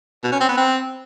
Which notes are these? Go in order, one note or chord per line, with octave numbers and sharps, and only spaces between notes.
B2
C#4
C4
B3
C4